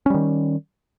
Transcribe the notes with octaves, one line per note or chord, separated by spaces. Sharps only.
D#3 G3 C#4